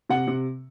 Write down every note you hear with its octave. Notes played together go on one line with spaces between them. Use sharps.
C3 F#5
C3